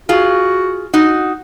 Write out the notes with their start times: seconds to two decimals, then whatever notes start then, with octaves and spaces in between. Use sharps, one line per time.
0.09 F4 F#4 G#4
0.94 D#4 F#4